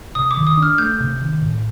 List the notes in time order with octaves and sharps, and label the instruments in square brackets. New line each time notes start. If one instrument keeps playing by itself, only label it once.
[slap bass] C3 [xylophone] D#6
[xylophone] D6
[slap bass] D#3
[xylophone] D#6
[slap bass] D4
[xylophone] F6
[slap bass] A3 [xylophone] G6
[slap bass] C3
D#3
A2